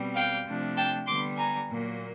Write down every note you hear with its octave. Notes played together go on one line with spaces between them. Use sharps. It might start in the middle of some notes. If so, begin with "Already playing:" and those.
Already playing: B2 G3 C4
F5 G5
C3 F3 A3 D4
G5 A5
D3 G3 B3 C6 D6
G#5 A#5
A#2 F#3 A#3